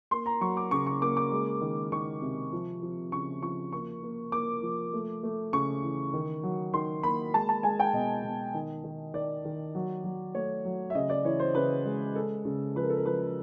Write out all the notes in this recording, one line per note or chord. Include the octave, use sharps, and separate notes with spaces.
A#3 C6
A#5
F#3 C#6
D6
C#3 C#6
C#6
A#3 D6
D6
G#3
D#3
D#3 C#6
C3
F3
F3
C#3 C#6
F3 C#6
A#3 C#6
A#3
A#3 D6
F3
A3
A3
C#3 C#6
E3
D#3
F#3
D#3 C6
A#3 B5
G#3 A5
A5
G#3 G#5
G5
B2 D#5
B2
D#3
D#3
D#3 D5
D#3
F#3
F#3
A3 C#5
F#3
E5
C#3 D#5
D5
E3 C#5
C5
C#3 B4
G#3
G#3 A4
C#3
F3 B4
A#4
A4
A#4
F3 B4